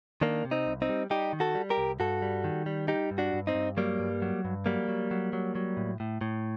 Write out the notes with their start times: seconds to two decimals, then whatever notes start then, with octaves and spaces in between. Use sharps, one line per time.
0.21 D#3 A#3 D4
0.45 C3
0.51 C4 D#4
0.66 C2
0.82 C4 D#4
0.89 G3
1.10 G3 D#4 G4
1.33 D#3
1.40 F#4 A4
1.55 G3
1.70 G4 A#4
1.78 C2
2.00 G2 F#4 A4
2.22 G3
2.44 D#3
2.66 G3
2.88 G3 D#4 G4
3.11 G2
3.18 D4 F#4
3.33 G2
3.47 C4 D#4
3.55 G2
3.77 F#3 G3 A#3
3.99 G2
4.22 F#3
4.45 G2
4.66 F#3 G3 A#3
4.88 F#3
5.11 F#3
5.33 F#3
5.55 F#3
5.77 A2
6.00 A2
6.21 A2